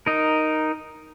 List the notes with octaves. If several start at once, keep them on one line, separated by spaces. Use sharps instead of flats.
D#4 A#4